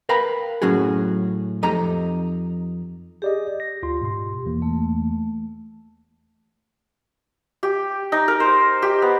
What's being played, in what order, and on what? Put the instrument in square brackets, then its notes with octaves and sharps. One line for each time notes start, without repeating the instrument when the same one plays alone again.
[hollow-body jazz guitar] A#4 B4 F5 G5 A#5 B5
A2 F#3 C#4 F#4 G#4
F2 D#4 G4 A4 A#5
[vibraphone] G4 [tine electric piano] G#4 D5 D#5
[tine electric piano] A#6
D2 F4 C6
G#2 B2 C6
E2 E3 A#3
[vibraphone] A3
[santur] G4
D#4
A#4
C5
G4
B3